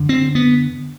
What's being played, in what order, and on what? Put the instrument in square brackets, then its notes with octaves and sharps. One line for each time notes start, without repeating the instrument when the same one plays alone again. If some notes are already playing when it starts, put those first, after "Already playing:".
Already playing: [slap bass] F#2 D3
C4
B3